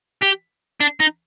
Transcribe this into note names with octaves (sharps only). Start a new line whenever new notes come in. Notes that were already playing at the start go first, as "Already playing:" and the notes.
G4
D4
D#4